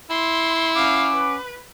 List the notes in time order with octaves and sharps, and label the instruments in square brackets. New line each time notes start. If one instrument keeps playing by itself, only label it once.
[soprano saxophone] E4 [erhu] C6
[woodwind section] C#4 F#5 D6 [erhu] F5
[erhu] B4